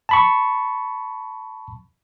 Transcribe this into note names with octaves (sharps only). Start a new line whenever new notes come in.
A5 B5 C#6